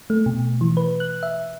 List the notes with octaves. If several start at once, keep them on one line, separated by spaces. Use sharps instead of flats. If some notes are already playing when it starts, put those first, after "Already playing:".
A3
B2
E3
B4
F#6
E5